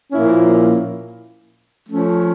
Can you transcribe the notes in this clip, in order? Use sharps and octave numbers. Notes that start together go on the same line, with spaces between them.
A#2 F3 A#3 C#4 E4
F3 A3 C#4